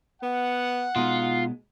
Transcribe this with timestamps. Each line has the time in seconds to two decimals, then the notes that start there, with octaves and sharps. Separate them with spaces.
0.23 B3 F#5
0.96 B2 G#3 D#4 F4